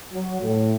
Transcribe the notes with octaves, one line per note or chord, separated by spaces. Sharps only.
F#3
A2